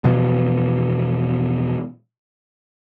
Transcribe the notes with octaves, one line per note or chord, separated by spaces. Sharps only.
E1 B2 E3 F3